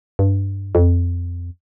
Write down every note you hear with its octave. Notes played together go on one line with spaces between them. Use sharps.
G2
F2